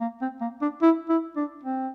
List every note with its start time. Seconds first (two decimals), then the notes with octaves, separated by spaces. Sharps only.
0.01 A#3
0.22 C4
0.41 A#3
0.62 D4
0.82 E4
1.09 E4
1.36 D4
1.63 C4